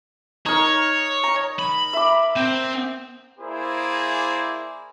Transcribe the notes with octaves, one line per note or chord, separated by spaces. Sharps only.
D#4 A#4 C#5
A#5
B5
E5 D6
C4
A#3 E4 G#4 A#4 C5 D5